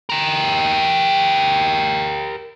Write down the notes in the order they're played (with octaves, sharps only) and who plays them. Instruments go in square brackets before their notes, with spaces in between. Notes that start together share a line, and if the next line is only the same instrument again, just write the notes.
[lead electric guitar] G4 A#4